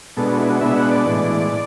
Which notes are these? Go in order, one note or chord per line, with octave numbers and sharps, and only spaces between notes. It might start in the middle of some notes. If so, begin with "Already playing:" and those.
B2 G#3 B3 D4 A4
F#4
E4
F#4
B2 G#3 B3 D4 E5
F#5
D5
A2 E3 G#3 D5